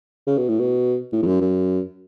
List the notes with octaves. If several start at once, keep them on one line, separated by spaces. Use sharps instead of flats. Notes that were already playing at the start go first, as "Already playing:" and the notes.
C#3
B2
A2
B2
A2
E2
F#2
F#2